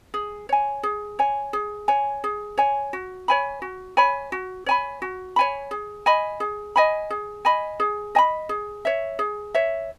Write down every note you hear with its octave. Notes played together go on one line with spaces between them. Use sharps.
G#4
C#5 G#5
G#4
C#5 G#5
G#4
C#5 G#5
G#4
C#5 G#5
F#4
C#5 G#5 B5
F#4
C#5 G#5 B5
F#4
C#5 G#5 B5
F#4
C#5 G#5 B5
G#4
D#5 G#5 B5
G#4
D#5 G#5 B5
G#4
D#5 G#5 B5
G#4
D#5 G#5 B5
G#4
C#5 E5
G#4
C#5 E5